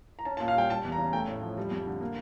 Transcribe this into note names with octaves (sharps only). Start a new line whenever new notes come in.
A#5
C#4 A5
A5
A#2
F5
G3 G5
G3 A5
E2
A#5
C#3
A3 G5
A2
F3
G3
F2
D3
A#3